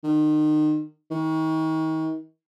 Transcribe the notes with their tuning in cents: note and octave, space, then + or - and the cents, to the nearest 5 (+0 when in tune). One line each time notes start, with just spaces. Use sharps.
D#3 -30
D#3 +35